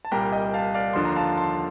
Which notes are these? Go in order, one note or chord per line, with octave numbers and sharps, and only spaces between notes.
A5
C2 A#2 G3 G5 A#5
D#5 G5
F5 A5
D5 F5
D#2 D3 F3 C6
A#5
F5 A5
A5 C6